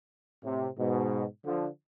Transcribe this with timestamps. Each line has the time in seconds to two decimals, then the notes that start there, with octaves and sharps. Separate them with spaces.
0.43 A2 C3
0.76 G#2 B2
1.44 D3 F3